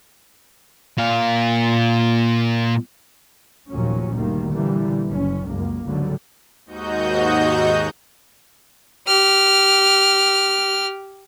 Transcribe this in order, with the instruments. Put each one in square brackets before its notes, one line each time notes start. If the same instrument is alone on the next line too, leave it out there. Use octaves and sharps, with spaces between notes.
[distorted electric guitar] A#2 F5
[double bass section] F1 D#2 A#2 F3 F#3 C#4
F#1 D2 D#3 G3 A#3
A#2 D3 E3 G3 A#3
F#1 C#4
C#2 F#2 A#3
G1 C#2 G#2 D3 F#3 G3
[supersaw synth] D#2 G#2 D#4 F#4 D#5 G6
[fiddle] G4 F6